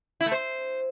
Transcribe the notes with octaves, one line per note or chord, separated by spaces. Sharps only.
E4
A3
C5